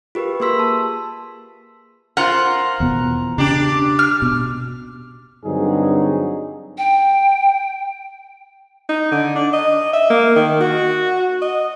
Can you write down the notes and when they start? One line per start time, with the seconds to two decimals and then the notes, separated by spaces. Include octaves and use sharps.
0.15 F4 G4 A#4 B4
0.40 A#3 G#4 C6 E6 B6
0.59 A5
2.17 F4 A#4 C5 F#5
2.80 E2 B2
3.38 C#3 D4 G4
3.99 F6
4.22 B2
5.45 G2 D3 F#3 C4 D#4 G#4
6.78 G5
8.89 D#4
9.11 D3
9.36 D4
9.53 D#5
9.94 E5
10.10 A#3
10.36 D#3
10.61 F#4
11.42 D#5